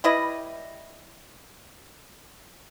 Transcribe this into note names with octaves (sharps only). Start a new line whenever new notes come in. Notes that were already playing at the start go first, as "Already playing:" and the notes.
G3 E4 B4 D#5